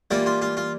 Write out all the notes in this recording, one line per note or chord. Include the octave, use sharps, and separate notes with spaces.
E3 G3 A#3 F4
F4
F4
F4